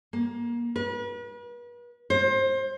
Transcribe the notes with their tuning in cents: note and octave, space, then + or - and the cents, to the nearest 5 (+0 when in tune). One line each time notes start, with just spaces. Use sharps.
A#3 +25
B4 -40
C5 +25